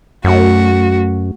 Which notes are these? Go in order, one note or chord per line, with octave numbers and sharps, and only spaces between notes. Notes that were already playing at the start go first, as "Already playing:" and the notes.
F#2 A3 F#4